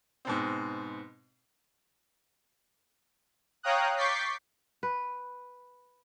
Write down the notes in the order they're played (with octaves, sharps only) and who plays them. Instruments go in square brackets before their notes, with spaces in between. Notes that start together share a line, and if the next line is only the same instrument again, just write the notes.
[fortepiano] G#2 B2 C4
[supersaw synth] C#5 F5 G5 A#5 D#6 F#6
C#6 D6 G6 A6 B6 C7
[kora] B4